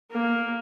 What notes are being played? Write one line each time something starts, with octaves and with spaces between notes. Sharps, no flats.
A#3